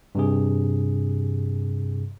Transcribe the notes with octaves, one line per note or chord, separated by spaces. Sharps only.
G2 C3 G#4